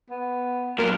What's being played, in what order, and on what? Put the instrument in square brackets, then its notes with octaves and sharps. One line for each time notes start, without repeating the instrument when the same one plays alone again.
[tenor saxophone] B3
[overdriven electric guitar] A#2 F#3 [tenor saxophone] A#4